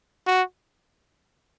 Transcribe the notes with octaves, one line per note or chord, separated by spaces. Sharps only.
F#4